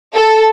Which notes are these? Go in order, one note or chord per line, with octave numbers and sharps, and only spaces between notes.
A4